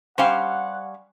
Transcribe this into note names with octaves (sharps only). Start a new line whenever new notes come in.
G3 C#4 G4 C5 F5 F#5